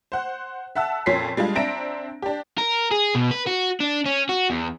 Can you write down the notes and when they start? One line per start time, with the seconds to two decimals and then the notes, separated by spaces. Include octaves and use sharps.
0.12 C5 F#5
0.75 E5 F#5 A5 E6
1.06 F2 A#2 C#4 C6 B6 C7
1.37 G3 G#3 D4 F4
1.55 C4 D4 E5 A#5 A#6 D7
2.22 D4 G4
2.58 A#4
2.91 G#4
3.15 B2
3.31 B4
3.47 F#4
3.80 D4
4.06 C#4
4.29 F#4
4.50 E2